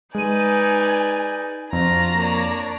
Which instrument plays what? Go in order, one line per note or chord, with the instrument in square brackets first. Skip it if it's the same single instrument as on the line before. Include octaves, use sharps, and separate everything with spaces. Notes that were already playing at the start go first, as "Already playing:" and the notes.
[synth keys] G#3 D#7 [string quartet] D#4 B4 D5 [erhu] G#5
[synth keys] F2 [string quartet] D4 [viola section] F4 F#4 [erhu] A#5
[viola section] A#3 C#5 D5